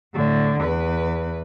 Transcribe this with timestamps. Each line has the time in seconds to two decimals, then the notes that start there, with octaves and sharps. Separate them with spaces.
0.14 A2 D3
0.61 E2 B4